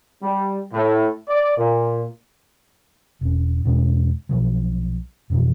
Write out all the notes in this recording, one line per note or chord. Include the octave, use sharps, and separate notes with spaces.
G3
A2
D5
A#2
E1 C#4
E2 B2 G#3 C#4
B1 B2 F3 F#3
F2 B2 E3 F3